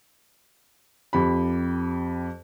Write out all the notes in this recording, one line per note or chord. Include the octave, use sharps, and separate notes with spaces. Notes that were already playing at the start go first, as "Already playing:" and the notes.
F2 G4 B5